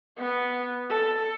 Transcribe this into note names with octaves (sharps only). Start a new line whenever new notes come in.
B3
A4